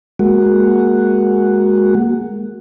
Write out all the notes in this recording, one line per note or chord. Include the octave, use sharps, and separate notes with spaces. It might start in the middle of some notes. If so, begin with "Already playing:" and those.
G#3 A#3 F#4